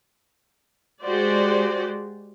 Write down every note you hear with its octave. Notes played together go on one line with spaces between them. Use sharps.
G#3 F#4 G4 C5 D5